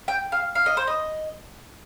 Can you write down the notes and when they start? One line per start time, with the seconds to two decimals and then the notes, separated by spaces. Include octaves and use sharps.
0.08 G5
0.32 F5
0.55 F5
0.66 D#5
0.77 C5
0.87 D#5